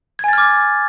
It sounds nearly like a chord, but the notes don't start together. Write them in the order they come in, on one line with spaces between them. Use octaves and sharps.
G#6 G#5 A6 F6 D6